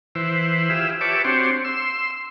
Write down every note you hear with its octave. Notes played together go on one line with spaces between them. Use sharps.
E3 E4 B4 C5
E4 F4 G4 G#4 E5
G4 B4 C#5 E5 A5 D6
C4 D4 F#4 G4 C5 C#5
C6 E6